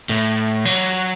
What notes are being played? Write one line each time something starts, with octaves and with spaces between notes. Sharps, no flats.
A2
F#3